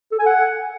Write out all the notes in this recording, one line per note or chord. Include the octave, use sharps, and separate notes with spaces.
A4
G#5
F#5